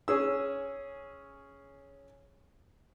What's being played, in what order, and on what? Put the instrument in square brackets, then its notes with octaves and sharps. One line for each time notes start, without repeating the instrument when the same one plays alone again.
[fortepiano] C#4 G#4 E6